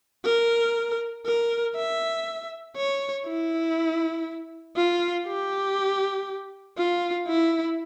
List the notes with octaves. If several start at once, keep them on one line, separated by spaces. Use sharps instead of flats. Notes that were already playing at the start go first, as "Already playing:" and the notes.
A#4
A#4
E5
C#5
E4
F4
G4
F4
E4